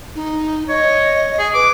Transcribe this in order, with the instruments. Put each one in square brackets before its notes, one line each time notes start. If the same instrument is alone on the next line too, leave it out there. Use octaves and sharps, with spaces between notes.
[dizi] D#4
[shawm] C#5 [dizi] D#5
[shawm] G#4
[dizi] B4 [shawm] D6